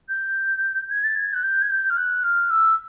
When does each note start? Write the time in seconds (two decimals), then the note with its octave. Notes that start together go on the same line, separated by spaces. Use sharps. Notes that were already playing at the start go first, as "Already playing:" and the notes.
0.09 G6
0.90 G#6
1.04 A6
1.16 G#6
1.34 F#6
1.43 G6
1.62 G#6
1.70 G6
1.90 F6
1.97 F#6
2.23 F6
2.50 E6